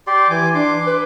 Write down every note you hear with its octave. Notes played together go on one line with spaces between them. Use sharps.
G4 D5 C6
E3 G#5 D6
D4 C6 D6
B4